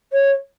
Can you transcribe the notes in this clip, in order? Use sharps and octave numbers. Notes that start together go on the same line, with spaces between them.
C#5